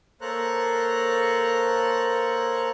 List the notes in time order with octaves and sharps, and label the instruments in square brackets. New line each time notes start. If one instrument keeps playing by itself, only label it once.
[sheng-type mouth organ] A#3 A4 C5 C#5 A#5 F#6